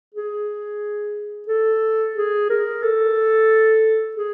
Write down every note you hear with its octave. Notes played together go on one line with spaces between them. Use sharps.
G#4
A4
G#4
A#4
A4
G#4